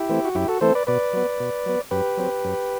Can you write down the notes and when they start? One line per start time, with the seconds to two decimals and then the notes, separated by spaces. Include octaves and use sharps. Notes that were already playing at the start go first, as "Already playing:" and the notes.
Already playing: E4 G4
0.09 E3 A3 C4
0.24 F#4
0.35 F#2 E4 G4
0.48 F#4 A4
0.61 E3 A3 C4 A4 C5
0.75 B4 D5
0.87 B2 B4 D5
1.13 F#3 B3
1.40 B2
1.66 F#3 B3
1.91 F#2 G4 B4
2.18 F#3 C4
2.44 F#2